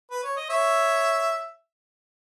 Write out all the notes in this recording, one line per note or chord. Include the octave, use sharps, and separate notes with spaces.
B4
C#5
D#5
C#5 E5